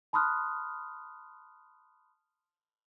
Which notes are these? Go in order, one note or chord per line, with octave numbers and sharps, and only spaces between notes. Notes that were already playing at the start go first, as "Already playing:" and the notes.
A5 B5 C6 D#6 F6 F#6